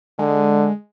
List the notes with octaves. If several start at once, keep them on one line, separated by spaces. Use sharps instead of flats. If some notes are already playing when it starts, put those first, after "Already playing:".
D3 G#3